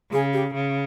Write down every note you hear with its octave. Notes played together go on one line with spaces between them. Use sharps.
C#3 G#4
G4
C#3